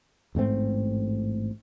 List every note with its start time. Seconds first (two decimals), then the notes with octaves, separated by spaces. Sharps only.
0.35 A1 G#2 A3 C4